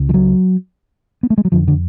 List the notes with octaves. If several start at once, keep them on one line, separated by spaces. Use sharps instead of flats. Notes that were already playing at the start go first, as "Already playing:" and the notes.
Already playing: C#2 C#3
F3
F#3
B3
A3
G#3
F#3
F2 D3 F3
D3